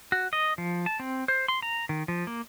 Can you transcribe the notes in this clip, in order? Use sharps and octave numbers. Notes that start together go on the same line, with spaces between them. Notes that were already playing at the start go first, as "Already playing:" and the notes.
F#4
D#5
F3
A5
C4
C5
C6
A#5
D#3
F3
A#3